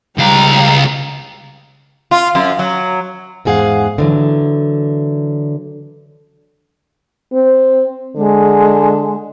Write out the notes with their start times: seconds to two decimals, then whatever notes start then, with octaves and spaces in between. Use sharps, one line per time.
0.18 C#2 G3 F5 A#5
2.11 F4
2.35 F#2
2.59 F#3
3.45 E2 G#2 G#4 F5 F#5
3.98 D3 E3 F#3
7.33 C4
8.17 D3 G#3